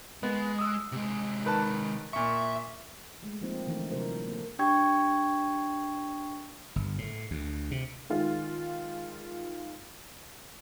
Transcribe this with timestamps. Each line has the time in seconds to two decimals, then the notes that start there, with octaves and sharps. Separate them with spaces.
0.23 G#3 B3
0.58 D#6 E6
0.92 C3 G#3
1.45 D#3 B4 A5
2.13 A#2 E5 C#6
3.23 G#3 A3
3.42 F3 A#3 C4 D#4 F4 C5
3.67 D3 E3 F3 A3 D#4
3.91 C3 F#3 D#4 A#4 C5
4.28 A#3 A4
4.59 D4 G4 G5 C#6 G#6
6.76 G1
6.98 A2
7.31 D2
7.71 C3
8.10 D#3 G#3 F4